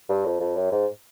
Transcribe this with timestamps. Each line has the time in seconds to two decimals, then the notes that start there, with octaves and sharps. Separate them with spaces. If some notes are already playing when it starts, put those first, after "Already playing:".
0.09 G2
0.26 F2
0.40 F2
0.56 F#2
0.72 G#2